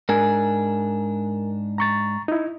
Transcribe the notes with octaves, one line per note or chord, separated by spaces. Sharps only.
G#2 D4 A#4 G#5
A#5 C#6 A6
D#4 E4